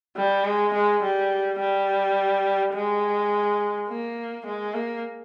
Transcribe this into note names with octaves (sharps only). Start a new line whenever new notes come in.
G3
G#3
G#3
G3
G3
G#3
A#3
G#3
A#3